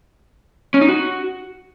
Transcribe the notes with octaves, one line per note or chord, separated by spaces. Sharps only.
C#4
D#4
F#4